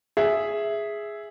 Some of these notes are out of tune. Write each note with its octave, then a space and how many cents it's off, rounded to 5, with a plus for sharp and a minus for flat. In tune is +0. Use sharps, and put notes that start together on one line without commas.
G#4 +0 E5 +0